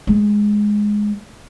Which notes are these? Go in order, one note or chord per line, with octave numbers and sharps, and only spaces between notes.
G#3